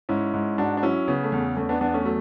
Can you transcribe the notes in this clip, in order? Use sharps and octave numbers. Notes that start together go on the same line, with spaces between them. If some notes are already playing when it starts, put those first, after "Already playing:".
G#2 C#4 E4
G#2
G#2 D4 F#4
D4
F#3 C#4 E4
C#3 B3
A3
E2
E2 A3 C#4
B3 D4
E2 B3 D4
A3 C#4
F#3 A3